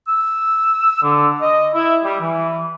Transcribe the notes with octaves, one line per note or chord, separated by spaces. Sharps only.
E6
D3
D#5
E4
G3
E3